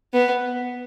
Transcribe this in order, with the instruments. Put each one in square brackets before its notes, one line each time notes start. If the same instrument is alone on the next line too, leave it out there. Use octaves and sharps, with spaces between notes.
[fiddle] B3